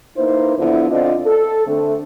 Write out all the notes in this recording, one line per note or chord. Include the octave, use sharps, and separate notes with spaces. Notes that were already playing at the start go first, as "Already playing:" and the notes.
A#3 D#4 E4 B4 C5
D3 F3 B3 E4
D3 C4 F4 D5 D#5
A4
D3 A3 C4